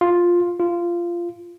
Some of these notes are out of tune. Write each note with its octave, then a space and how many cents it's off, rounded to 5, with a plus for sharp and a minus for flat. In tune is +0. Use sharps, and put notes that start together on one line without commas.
F4 +5
F4 -15